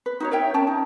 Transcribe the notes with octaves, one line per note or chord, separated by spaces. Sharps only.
B4
D#4 F#4 C#5
A#4 C#5 E5 G5
C#4 G5 A5 A#5
D#4